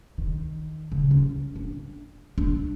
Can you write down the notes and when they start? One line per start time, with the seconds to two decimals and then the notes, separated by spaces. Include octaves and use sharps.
0.18 D#3
0.92 C#3
1.11 C#4
1.56 D4
2.38 D4